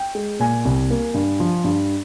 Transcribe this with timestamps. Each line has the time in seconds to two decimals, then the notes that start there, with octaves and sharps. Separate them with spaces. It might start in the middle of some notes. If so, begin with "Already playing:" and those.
Already playing: G5
0.15 G#3
0.39 A#2 G#5
0.65 C2
0.90 A#3
1.14 G2
1.40 F3
1.64 G2